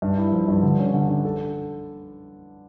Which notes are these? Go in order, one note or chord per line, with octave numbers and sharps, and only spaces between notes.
G2
E4
F3
G2
D3
C#4
D3
D3
A4